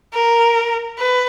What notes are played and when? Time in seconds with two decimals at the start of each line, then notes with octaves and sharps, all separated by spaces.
0.14 A#4
0.99 B4